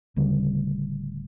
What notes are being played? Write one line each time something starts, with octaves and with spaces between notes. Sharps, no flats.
D1 D2 C#3 G3